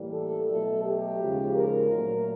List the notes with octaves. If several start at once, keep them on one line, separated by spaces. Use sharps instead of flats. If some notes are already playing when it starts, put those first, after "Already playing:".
Already playing: A2 E3 G3 A#3
A4
B2 F#3 A3
G4
D#2 C#3 F3 G#3
A#4
A#2 F#3 A3